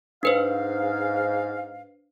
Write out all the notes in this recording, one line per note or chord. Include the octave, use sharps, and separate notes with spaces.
G#2 D4 B4 C5 F5